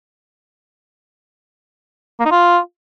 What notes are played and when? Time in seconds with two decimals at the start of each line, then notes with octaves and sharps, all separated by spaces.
2.20 A#3
2.25 D#4
2.31 F4